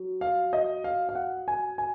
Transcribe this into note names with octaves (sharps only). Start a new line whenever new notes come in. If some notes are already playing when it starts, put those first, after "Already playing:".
Already playing: F#3
F5
D#5
F5
F5
F#5
G#5
G#5